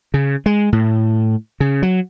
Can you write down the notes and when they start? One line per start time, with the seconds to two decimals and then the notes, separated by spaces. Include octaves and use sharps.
0.14 C#3
0.46 G#3
0.72 A2
1.60 C#3
1.83 F#3